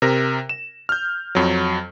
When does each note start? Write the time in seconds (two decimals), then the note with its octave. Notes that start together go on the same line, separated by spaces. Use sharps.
0.02 C3 A#4 A#6
0.49 E7
0.89 F6 G6
1.35 F2 F#3